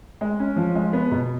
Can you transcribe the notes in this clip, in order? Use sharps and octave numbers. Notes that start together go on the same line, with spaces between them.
G#3
C#4
F3
G#3
B3
B2